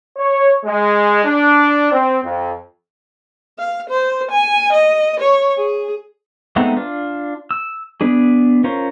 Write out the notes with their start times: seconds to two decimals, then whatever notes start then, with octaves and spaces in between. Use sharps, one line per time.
0.17 C#5
0.65 G#3
1.25 D4
1.92 C4
2.23 F2
3.59 F5
3.90 C5
4.31 G#5
4.73 D#5
5.20 C#5
5.57 G#4
6.56 G#3 A3 B3 C4 D#4
6.77 D4 F4
7.51 E6
8.01 B3 D4 G#4
8.64 C#4 F4 A#4 C5